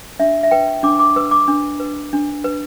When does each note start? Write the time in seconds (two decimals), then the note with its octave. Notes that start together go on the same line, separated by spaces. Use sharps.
0.20 D4 E5
0.43 E5
0.51 B4 G5
0.83 D4 D6
0.99 D6
1.16 B4 E6
1.31 D6
1.48 D4
1.80 B4
2.13 D4
2.44 B4